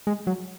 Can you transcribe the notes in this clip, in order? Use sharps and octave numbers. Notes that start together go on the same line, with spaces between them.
G#3
F#3